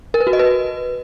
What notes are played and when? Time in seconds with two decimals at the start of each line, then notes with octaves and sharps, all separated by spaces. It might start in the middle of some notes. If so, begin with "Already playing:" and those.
0.14 A#4
0.20 B4
0.27 F#4
0.33 D#5
0.39 B4